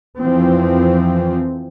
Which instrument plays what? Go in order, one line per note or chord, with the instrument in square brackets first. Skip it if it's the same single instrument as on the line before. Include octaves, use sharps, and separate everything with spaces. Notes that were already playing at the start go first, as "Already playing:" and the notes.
[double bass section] F2 E3 F3 C4